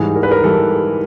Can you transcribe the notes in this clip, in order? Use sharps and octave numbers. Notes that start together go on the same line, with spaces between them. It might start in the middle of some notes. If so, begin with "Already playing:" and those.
Already playing: G#2 E3 G3 G#4
A#4
B4
A#4
E3 G3 A4